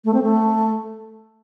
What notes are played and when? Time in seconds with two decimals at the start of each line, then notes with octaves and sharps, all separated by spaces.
0.05 A3
0.14 C4
0.23 A3